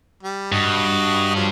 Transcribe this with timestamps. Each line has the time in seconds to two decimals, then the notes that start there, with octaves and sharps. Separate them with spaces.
0.23 G3
0.52 G2 F#4 D#5
1.35 F3 F#3